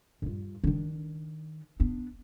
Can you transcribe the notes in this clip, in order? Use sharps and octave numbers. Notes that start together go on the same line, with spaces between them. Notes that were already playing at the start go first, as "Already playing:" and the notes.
G2 F4
D#3 D4
B3 D4